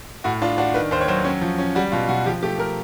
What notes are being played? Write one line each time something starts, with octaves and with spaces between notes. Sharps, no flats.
A2 F#4
D4 F4
D4 F#4
D#3 B4
D#2 C5
C#5
F#3 C5
C#4
F3
C#4
G3 F#4
B2 F4
B2 F#4
F3 G4
A3 G4
A3 A#4